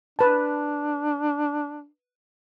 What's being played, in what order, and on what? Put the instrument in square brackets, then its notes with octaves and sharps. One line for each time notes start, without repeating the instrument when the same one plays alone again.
[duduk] D4 [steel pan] B4 A5